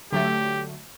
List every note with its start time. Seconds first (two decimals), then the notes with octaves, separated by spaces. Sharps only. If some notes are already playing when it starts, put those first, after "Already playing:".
0.12 D3 F#3 A3 G4